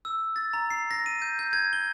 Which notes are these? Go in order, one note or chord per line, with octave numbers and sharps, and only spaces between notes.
E6
A6
A#5
C7
A#6
D#7
G6
G6
G#6
G7